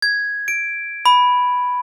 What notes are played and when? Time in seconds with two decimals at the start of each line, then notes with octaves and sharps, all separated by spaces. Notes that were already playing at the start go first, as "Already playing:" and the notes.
0.02 G#6
0.48 D7
1.06 B5